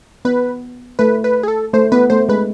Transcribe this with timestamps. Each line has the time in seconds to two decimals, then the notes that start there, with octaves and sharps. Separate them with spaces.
0.25 B3 B4
0.99 A3 B4
1.24 B4
1.43 G#4
1.48 A4
1.73 A3 C5
1.92 B3 B4
2.10 A3 C5
2.29 G#3 B4